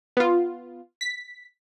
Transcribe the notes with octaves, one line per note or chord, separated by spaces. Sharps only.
B3 F4
B6